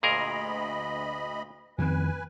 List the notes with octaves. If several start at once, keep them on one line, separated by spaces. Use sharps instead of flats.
D2 A#2 G#4 A#4 D#5 B5
F2 D#3 C4 B4 G#5